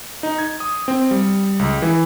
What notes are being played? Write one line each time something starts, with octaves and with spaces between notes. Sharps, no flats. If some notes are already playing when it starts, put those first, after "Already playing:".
D#4
G#6
D#6
C4
G3
C#2
E3